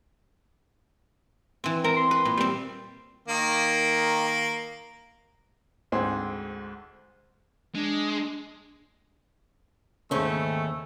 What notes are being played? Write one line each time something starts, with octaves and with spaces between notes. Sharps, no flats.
E3 C4
C4 A#4
C6
B4
A#2
G3 C4
D#3 A#3
D2 G#2 C4 G#4 C6
G#3 D4
D#2 G#2 C#3 A3 C4 C#4